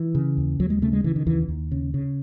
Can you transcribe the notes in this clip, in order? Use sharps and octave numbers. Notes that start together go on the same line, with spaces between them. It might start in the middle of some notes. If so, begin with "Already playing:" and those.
Already playing: E3
C#3
D#2
D#2 F#3
G#3
C#3 A3
G#3
C#3 E3
D#3
D#2 E3
D#2
C#3
C#3